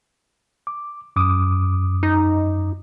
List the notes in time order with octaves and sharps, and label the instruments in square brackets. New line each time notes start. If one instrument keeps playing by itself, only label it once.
[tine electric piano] D6
F#2 D6 D#6
[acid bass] D#4